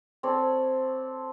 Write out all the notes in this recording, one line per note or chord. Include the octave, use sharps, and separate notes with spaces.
C4 A4 C#5 D5